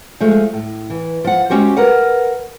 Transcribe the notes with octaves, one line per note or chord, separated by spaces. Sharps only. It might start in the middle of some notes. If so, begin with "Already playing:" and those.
F3 G#3 A3
A2
E3
F3 F#5
G#3 C#4 F#4 G4 C5
A#4 B4 F#5